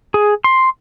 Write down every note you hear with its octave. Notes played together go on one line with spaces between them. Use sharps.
G#4
C6